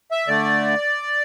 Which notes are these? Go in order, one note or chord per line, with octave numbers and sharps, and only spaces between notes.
E5
D3 A3 D5